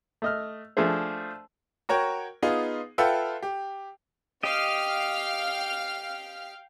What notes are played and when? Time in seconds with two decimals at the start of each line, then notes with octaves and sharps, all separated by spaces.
0.22 A3 D#5 F6
0.77 F3 A3 D4 G#4 C5
1.89 F#4 A#4 C#5 G5
2.43 B3 D#4 F4 G#4
2.98 F4 A4 B4 E5 F#5 G5
3.43 G4
4.43 G4 D#5 F5 G5 F6